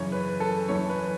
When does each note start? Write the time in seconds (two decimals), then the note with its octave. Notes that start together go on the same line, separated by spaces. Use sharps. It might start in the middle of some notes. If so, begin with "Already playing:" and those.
Already playing: F#2 C#3 E3 C#5
0.12 B4
0.40 A4
0.69 F#2 E3 C#5
0.90 B4